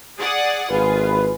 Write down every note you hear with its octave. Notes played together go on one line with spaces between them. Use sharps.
G#4 D5 F#5
G#1 F4 G#4 B4